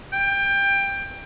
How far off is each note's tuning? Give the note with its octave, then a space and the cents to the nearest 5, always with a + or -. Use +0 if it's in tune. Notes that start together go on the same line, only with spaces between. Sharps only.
G5 +20